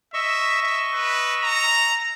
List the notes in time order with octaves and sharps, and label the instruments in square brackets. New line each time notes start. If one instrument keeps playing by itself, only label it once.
[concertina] D#5 C#6 E6 [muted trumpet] E5
[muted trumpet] E5
B4
A#5